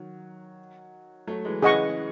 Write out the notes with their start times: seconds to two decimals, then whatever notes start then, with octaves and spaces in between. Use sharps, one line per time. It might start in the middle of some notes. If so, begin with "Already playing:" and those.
Already playing: D#3 F#3
1.27 F#3 A3
1.45 E3 G#3
1.62 C#3 E3 G#4 D#5 F#5 C#6